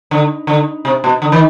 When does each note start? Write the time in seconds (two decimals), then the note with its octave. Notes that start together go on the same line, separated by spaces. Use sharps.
0.11 D3
0.47 D3
0.85 C3
1.04 B2
1.22 D3
1.32 D#3